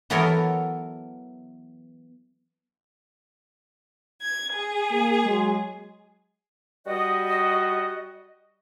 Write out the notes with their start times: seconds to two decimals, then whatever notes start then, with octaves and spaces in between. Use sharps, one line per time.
0.10 E3 F#3 B3 A4 A#4 C#5
4.21 G#6
4.52 G#4
4.91 A#3
5.24 F#3 G#3
6.87 G3 F#4 D#5